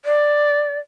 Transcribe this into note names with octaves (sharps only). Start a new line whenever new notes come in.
D5